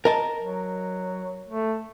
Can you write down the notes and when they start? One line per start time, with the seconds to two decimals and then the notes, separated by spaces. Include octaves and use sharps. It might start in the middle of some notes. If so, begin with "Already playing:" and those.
0.05 A#4 D#5 A5
0.42 F#3
1.48 A3